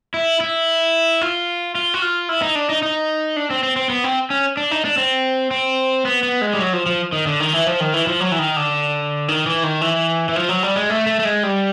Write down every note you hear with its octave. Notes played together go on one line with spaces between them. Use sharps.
E4
E4
F4
F4
F#4
F4
E4
D#4
D4
D#4
D#4
D4
C4
C4
C4
B3
C4
C#4
D4
D#4
D4
C4
C4
B3
B3
G#3
G3
F#3
F3
F3
D#3
D3
D#3
E3
F3
D#3
E3
F3
F#3
E3
D#3
D3
D#3
E3
D#3
E3
E3
F3
F#3
G3
G#3
A3
A3
A3
G#3
G3